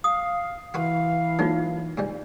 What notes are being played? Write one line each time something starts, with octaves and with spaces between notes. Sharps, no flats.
F5 D#6
E3 F4 F#4 B4 F5
G#2 F#3 A#3 D#4 F4
G#2 E3 G3